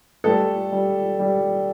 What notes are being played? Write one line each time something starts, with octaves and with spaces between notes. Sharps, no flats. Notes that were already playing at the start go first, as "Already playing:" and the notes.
G3 A3 A4
G3
G3